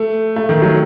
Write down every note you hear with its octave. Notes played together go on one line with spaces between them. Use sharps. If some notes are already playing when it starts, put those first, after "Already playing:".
Already playing: A3
A3
D#3
F#3